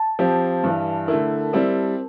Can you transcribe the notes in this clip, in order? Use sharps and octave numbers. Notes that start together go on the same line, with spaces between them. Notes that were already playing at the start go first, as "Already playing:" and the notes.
Already playing: A5
F3 C4 G4
G2 E3 G3
D3 A3 E4 A#4
G3 C4 E4